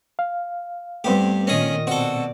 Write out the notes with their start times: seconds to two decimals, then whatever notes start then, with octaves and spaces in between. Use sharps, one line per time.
0.19 F5
1.04 G2 A3 B3 C4 G4
1.47 A#2 D#3 C#4 G#4 D#5
1.87 B2 C4 F#4 A4 D5